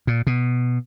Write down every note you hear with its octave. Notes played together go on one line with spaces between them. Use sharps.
A#2
B2